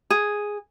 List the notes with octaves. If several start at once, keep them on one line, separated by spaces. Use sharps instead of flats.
G#4